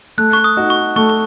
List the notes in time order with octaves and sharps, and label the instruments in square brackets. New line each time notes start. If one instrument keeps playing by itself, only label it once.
[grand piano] A3 [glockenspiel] F#6
[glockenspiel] C#6
D#6
[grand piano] D#4 F#4
[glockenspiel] C#6
[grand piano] A3 [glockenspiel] C#6
[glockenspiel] C#6